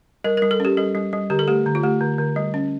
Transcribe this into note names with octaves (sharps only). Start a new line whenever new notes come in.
G3 A#4
G3 A#4
A4
C#4 G4
G3 A4
G3
G3
D3 G4
A4
A3 G4
D3
F4
A3 G4
D3
D3
G3
C#4